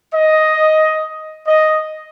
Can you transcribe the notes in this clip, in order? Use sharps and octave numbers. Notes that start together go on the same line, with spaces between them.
D#5
D#5